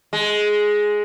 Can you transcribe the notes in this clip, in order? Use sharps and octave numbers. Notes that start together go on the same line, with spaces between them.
G#3